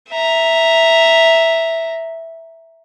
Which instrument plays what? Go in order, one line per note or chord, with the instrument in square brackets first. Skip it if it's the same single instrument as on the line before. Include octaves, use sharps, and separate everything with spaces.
[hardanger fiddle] E5 A#5